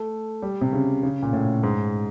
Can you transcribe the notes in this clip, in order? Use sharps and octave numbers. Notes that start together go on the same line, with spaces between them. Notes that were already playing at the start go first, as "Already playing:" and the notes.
Already playing: A3
G3
C3
C#3
C#3
A#2
A2
G#2